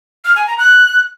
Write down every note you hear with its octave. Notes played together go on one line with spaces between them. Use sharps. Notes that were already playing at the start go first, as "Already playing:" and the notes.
F6
G#5
A#5
F#6